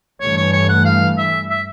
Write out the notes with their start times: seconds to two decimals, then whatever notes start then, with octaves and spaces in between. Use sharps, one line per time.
0.21 G2 E3 A3 C#5
0.37 C#5
0.53 C#5
0.69 F#5
0.85 F5
1.18 E5
1.50 E5